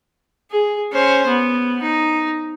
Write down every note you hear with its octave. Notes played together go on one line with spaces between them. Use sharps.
G#4
C#4 C5
B3
D#4